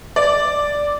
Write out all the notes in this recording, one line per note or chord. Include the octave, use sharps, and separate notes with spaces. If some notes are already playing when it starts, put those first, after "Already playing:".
D5